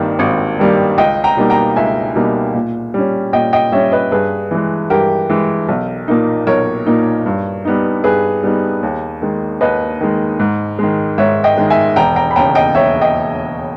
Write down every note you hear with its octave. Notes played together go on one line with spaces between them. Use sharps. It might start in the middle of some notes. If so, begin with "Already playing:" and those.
Already playing: G#1 G2 D#3 G3 A#3
G#1
G2 D#3 G3 A#3
C#2 D#5 G5
G5 A#5
B2 G3 A#3 D#4
G5 A#5
C#2 E5 G#5
B2 G3 A#3 D#4
A#2
G3 C#4
A#2 D#5 G5
D#5 G5
G3 C#4 C#5 E5
B4 D#5
G2 G#4 B4
E3 G#3
G2 G4 A#4
E3 G#3
B1
A#2 A#3 D#4
B1 A#4 C#5
A#2 A#3 D#4
G2
G3 B3 D#4
G2 G#4 B4
G3 B3 D#4
D#2
D#3 G#3
D#2 B4 D#5
D#3 G#3
G#2
D#3 G#3
G#2 C#5 E5
D#5 G5
D#3 G#3
E5 G#5
E1 G5 A#5
G5 A#5
B5
D#2 C#3 G5 A#5
D#5 G5
E1 C#5 E5
D#5 G5